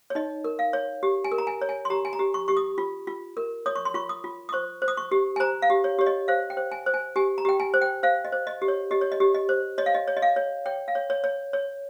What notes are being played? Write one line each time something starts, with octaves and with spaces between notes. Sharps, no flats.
C#5
D#4 D#5
A#4
F5
C#5
G4
G#5
A#4
A#5
G#5
C#5
G#5
C6
G4 A#5
G#5
A#5
G4
C#6
G4 C#6
D#6
F4
F4
A#4
C#5 D#6
C#6
C6
F4 C#6
D#6
F4
D#6
C5 C#6
C5
D#6
C#6
G4
G#5
C5 A#5
F5
G4
C#5
G4 C#5
D#5
C5 F5
G5
C5
G#5
C5
G#5
G4 G#5
A#5
G4 G5
G#5
C5
G5
C5 F5
D#5
C5
D#5
G4
C#5
G4 D#5
C#5
D#5
G4
D#5
C5
C#5 D#5
F5
D#5
C#5
D#5
F5
C#5
C#5 G5
F5
C#5
C#5
C#5
C#5